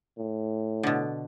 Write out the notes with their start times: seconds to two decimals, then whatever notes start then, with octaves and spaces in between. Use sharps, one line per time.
0.18 A2
0.83 B2 D3